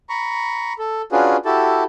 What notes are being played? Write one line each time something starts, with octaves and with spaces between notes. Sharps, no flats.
A#5 B5 C#6
A4
C#4 D4 F4 F#4 G#4 B4
E4 F#4 G4 A4 A5